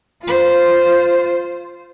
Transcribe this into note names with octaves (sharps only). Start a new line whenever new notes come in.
F4 C5